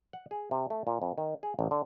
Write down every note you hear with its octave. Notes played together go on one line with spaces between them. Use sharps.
F#5
G#4
C3
A3
A#2
F2
D#3
G#4
A1
D3